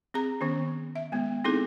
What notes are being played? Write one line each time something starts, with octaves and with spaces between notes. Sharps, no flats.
C4 G#4 A#5
D#3 B3 C#4
E5
G#3 B3
B3 C4 D#4 E4 G#4 A4